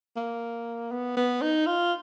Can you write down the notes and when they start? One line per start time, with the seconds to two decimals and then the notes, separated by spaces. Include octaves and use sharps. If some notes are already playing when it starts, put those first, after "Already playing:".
0.16 A#3
0.91 B3
1.17 B3
1.42 D#4
1.66 F4